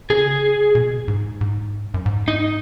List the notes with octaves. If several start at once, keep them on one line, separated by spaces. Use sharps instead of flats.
C#3 G#4
B2
G#2
G#2
F#2
G#2
D#4